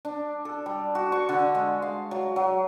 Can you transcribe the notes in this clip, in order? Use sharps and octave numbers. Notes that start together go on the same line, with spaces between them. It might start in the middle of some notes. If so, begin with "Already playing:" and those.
D4
A4
G3
F#4
C#6
D3
G#3
F5
F#3
F#3